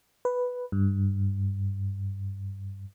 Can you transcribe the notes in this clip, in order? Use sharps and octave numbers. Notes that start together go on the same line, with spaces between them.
B4
G2